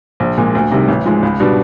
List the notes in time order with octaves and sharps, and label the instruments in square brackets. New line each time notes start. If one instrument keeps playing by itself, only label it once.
[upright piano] A#1
A#2 F3 G#3
D2
C3 D#3 G3
A1
G#2 F3 G#3
C#2
B2 G3 B3 D4